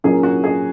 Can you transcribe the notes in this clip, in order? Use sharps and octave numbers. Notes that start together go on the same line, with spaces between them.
A#2 F#3 A#3 C#4 G#4
F#4
G#4